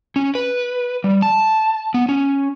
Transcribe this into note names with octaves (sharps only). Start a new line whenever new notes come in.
C#4
B4
G3
A5
B3
C#4